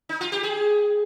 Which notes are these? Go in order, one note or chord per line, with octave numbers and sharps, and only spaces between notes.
D#4
F4
G4
G#4